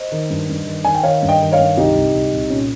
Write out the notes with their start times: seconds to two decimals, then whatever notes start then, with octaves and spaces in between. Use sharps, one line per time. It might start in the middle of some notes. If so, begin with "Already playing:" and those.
Already playing: C5 D#5
0.12 D#3
0.30 G2
0.49 G2
0.67 D#3
0.85 D#3 G#5
0.95 G5
1.03 D#3 C#5 F5
1.23 G2
1.28 D#5 G5
1.41 D#3
1.52 C#5 F5
1.58 G2
1.77 C2 D#4 G4
1.95 C2
2.14 C2
2.33 C2
2.50 A#2 C#4